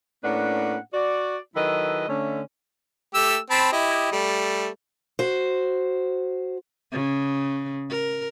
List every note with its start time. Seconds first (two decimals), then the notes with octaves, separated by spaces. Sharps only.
0.24 A2 A#3 C#4 D4 B4 F#5
0.93 F#4 D5
1.56 D#3 F#3 E4 A4 B4 D#5
2.09 D3 A3 C#4
3.14 A3 G4 E6
3.50 C4 A5 B5
3.72 E4 G4 D#5
4.12 G3 A3
5.19 F#4 C5
6.92 C#3
7.90 A#4